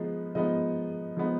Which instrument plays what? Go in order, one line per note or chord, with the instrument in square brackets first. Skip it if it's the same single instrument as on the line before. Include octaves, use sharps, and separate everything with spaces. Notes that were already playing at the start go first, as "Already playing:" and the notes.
Already playing: [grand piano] F3 G#3 B3 D#4
F3 G#3 B3 D#4 D#5
F3 G#3 B3 D#4